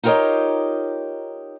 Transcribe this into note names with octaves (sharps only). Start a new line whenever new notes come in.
D#4 F4 G4 A#4 C#5 D#5